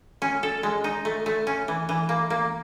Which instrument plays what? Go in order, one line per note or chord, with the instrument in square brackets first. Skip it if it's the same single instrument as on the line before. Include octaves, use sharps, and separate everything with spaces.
[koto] C#4
A4
G#3
D#4
A3
A3
C#4
E3
E3
A#3
A#3